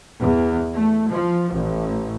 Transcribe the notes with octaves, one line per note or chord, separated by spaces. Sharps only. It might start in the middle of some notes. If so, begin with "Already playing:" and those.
E2
A3
F3
A1